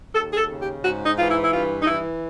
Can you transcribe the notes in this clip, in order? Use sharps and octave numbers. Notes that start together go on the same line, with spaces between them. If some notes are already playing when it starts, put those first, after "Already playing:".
D#2 A4
G#4
A4
C#3
G4
G#2 F#4
D#4
E3 F4
E4
E4
G2 F4
D#4
E3 E4